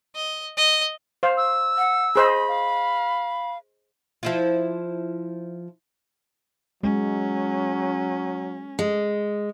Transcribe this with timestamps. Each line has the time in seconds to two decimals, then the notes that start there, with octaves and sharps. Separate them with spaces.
0.15 D#5
0.57 D#5
1.23 C5 F5
1.37 E6
1.78 F#5
2.16 G#4 C5 D#5 B5
2.48 F5
4.23 F3 E4 F4
6.83 F#3 G#3 C#4
8.79 G#3